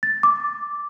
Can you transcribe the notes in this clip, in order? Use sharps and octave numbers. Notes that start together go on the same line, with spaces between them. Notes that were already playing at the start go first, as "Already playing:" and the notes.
A6
D6